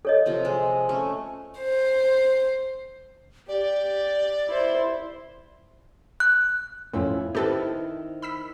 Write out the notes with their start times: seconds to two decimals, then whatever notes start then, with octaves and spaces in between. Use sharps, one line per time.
0.05 A4 C#5 D#5
0.26 C3 F3 C4
0.45 G#3
0.89 A3 C#4
1.59 C5
3.48 G4 D5 G5
4.47 E4 C5
6.20 F#6
6.93 F2 A2 C#4 E4 F4
7.35 D#3 C4 E4 G4 A4 B4
8.22 B5 E6 B6